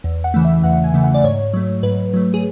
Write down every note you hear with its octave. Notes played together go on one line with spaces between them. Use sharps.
E2
F#5
C#3 E3 A3
E5
E2 F#5
G#5
C#3 E3 A3
F#5
D5
G#2 C#5
F#3 A3
G#2 B4
F#3 A3
G#4